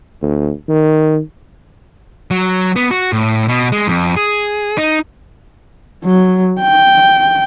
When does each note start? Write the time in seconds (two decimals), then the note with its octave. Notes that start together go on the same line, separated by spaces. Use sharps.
0.22 D2
0.68 D#3
2.31 F#3
2.76 B3
2.91 F#4
3.13 A2
3.48 B2
3.72 G#3
3.87 F2
4.16 G#4
4.78 D#4
6.04 F#3
6.61 G5